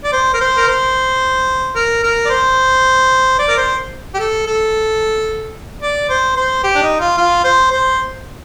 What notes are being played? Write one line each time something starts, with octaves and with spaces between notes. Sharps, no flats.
D5
C5
A#4
C5
A#4
C5
A#4
A#4
D5
C5
D5
A#4
C5
G4
A4
A4
D5
C5
C5
G4
D4
D#4
F4
F4
C5
C5